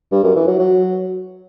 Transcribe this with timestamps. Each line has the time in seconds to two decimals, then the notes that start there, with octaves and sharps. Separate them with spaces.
0.12 G2
0.24 F#2
0.35 E3
0.47 F#3
0.59 F#3